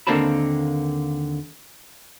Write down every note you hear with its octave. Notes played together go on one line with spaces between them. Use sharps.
D#2 D3 A#3 C4 A5 B5